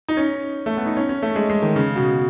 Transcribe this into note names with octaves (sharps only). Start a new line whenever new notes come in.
D#4
C#4
A3
B3
D#4
C#4
C#4
A3
G#3
G#3
D#3
C#3
B2